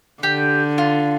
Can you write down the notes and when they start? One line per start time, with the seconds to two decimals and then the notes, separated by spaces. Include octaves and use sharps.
0.23 D3 G4
0.78 F4